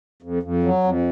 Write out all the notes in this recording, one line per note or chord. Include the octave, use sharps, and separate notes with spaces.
F2
F2
F#3
F2